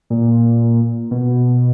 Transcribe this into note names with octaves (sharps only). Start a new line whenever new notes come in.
A#2
B2